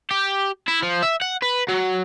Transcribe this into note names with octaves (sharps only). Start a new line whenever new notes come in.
G4
E4
F3
E5
F#5
B4
F#3